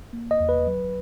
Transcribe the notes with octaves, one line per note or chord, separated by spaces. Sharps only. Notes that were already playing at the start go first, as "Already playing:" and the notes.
A#3
D#5
E2
B4
F#3